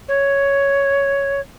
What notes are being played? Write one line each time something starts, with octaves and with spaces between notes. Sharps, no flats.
C#5